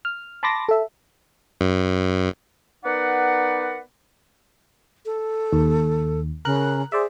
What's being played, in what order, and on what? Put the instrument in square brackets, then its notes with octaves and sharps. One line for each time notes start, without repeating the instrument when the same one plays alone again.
[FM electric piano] F6
A5 B5 C6 D6 A6 A#6
A4 E5
[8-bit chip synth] F#2
[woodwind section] B3 D#4 A#4 B4 D5 F#5
[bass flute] A4
[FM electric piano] D#2
[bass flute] C#3 [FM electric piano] A#4 F#6
[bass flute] G#4 [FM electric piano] C5 D5 E5